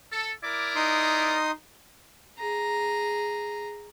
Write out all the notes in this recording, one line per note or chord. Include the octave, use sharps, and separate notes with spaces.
A4
E4 A#4 D5 D6
D#4 C6 D#6
G#4 A#5